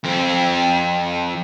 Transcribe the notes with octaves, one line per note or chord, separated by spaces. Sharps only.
F2 C4